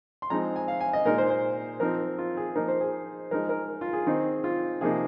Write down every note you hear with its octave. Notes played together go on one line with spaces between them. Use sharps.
C6
F3 G#3 C4 D#4 A#5
G#5
F5
G#5
D#5
A#2 G#3 D#4 A#4
C5
C5
F3 C4 D#4 A#4
F4
G#4
F3 A#3 D#4 A#4
C5
G#4
F3 G#3 D#4 A#4
A#4
F4
G#4
D#3 C4 D#4
F4
C3 F3 A#3 D#4 G#4